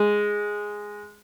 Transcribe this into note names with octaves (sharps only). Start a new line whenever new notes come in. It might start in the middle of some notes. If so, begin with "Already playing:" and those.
Already playing: G#3